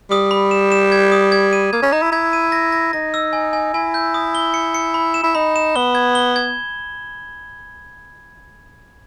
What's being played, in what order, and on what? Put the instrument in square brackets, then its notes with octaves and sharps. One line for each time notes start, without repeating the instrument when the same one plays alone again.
[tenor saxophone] G3 [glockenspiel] D#6
[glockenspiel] B5
E7
E7
G#6
D#6
G#6
D#7
[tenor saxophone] A#3 [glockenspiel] G#6
[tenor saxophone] C#4
[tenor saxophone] D#4 [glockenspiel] A#5
[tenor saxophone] E4
[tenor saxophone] E4 [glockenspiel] G#6
[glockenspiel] D#7
A#6
A#6
[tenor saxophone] D#4 [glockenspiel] A#6
[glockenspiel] E6
G#5
G#5
[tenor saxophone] E4 [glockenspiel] G#5
[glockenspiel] G6
D#6
G7
C#7
C#7
B5
E7
[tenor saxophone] E4
[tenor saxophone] D#4 [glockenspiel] B5
[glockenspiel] E7
[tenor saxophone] B3 [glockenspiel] G7
[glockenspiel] G#6
G7
G#6